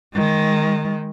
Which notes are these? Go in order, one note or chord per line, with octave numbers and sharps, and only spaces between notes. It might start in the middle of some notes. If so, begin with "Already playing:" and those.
D#3 G#3